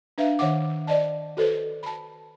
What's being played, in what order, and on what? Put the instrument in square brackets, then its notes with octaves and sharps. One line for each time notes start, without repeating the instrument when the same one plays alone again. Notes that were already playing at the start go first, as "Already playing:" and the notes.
[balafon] D4 B4 E5 F5
D#3 C#5 E5 F#5 D6
C5 D5 D#5 A5
F#4 A4 B4 C5
A5 B5